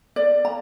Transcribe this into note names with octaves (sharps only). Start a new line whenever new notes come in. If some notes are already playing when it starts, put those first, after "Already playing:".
D5
A#5